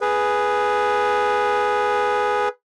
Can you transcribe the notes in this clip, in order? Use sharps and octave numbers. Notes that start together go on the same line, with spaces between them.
G#4 B4